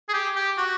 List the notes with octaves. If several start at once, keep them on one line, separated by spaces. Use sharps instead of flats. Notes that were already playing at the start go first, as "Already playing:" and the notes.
G#4
G4
G4
F#4